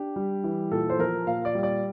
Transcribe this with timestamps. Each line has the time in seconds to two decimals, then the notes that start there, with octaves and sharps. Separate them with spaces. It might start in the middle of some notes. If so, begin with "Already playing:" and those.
Already playing: D4 G4
0.16 G3
0.44 E3
0.71 A#2 A4
0.89 C5
0.99 F3 A#4
1.26 A#2 F5
1.45 D5
1.55 G3
1.63 D5